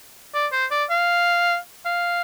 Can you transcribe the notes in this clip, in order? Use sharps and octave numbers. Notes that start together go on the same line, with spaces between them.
D5
C5
D5
F5
F5